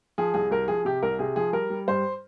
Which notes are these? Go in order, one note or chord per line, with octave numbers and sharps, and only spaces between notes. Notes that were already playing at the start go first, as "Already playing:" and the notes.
F3 G#4
C2 G#4
C2 A#4
F3 G#4
C3 G4
C2 A#4
C3 G#4
F3 G#4
G3 A#4
G3
G2 C5